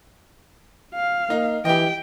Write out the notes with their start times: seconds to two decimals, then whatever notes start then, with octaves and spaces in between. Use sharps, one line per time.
0.94 F5
1.30 A#3 D#4
1.65 E3 G4 D#5 G5